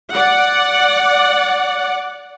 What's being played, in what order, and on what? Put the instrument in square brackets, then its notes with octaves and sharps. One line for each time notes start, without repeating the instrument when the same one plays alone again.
[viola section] D5 F#5